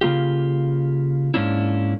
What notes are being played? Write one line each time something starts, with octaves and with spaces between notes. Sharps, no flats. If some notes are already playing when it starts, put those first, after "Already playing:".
C#3 A#3 F4 G4
G#2 C3 A#3 C#4 D4 E4